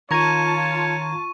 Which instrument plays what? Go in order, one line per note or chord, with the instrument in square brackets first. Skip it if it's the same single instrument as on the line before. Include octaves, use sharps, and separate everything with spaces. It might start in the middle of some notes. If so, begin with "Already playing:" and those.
[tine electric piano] D#3 A#5 G#6 [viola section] F4 A5 [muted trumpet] C#5 [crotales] C#6 D#7